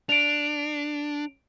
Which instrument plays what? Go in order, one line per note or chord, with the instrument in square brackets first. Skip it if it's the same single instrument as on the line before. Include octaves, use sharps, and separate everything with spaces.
[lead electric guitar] D4 [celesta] D7 F7